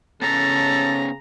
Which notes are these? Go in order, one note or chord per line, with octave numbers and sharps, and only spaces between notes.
C#3 B3 C#4 A4 A5 A#5